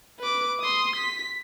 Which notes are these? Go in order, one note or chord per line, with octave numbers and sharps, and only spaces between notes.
B4 D6
C6 D#6
B6